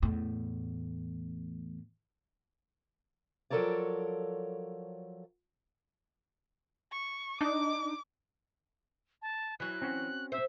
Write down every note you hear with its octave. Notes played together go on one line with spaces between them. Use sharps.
E2 A2
F3 F#3 A4 A#4 C#5 D5
C#6
D4 D#4 D6
A5
E3 F#3 F#6
C4 C#4 F#4
C5 E5